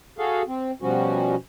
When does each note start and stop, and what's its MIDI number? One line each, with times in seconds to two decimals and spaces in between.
0.19 0.42 66
0.19 0.42 68
0.19 0.42 69
0.19 0.42 77
0.48 0.71 60
0.82 1.35 47
0.82 1.35 53
0.82 1.35 55
0.82 1.35 61
0.82 1.35 66